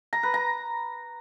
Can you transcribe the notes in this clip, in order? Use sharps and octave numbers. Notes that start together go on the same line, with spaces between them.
A#5
B4
A#5